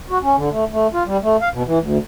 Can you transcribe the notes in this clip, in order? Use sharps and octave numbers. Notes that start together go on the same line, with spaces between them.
F#4
C#4
D3
A3
A3
F4
G3
A3
F5
B2
E3
D2